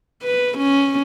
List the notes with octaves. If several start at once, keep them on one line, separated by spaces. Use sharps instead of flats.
B4
C#4